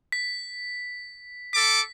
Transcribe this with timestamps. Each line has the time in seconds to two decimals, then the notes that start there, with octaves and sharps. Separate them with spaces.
0.12 B6
1.53 A4 D6 B6